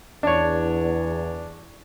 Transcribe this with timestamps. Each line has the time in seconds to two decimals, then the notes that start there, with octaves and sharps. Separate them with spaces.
0.23 E2 D4 C#5